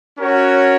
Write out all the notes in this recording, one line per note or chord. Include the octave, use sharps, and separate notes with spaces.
C#4 F#4 A#4 C#5